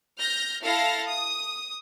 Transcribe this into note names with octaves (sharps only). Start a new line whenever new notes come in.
F6 G6 A#6
E4 A4 F5 A5 F6 A#6
D#6